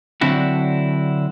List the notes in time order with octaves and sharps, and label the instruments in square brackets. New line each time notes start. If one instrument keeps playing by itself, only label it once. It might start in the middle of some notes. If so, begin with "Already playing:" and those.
[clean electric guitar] D3 F#3 C4 D4 E4 F#4